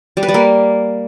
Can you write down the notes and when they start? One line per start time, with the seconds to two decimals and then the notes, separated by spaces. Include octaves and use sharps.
0.17 G3
0.23 B4
0.28 G3
0.34 A#3